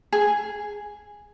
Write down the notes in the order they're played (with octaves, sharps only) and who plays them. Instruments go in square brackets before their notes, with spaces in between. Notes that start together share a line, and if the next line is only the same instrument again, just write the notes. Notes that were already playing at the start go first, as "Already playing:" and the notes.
[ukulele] G#4